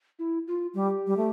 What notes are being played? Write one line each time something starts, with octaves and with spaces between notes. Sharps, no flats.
E4
F4
G3 G4
G3
A3